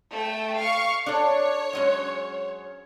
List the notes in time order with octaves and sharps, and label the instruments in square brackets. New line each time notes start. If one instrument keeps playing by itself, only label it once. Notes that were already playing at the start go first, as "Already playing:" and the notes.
[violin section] A3 G5
F5 C#6
[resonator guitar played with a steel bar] D4 A4 [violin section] C#5
[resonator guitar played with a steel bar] F#3 G#3 C#4